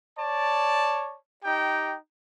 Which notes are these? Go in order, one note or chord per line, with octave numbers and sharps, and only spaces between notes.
C#5 D5 A5
D#4 G4 G5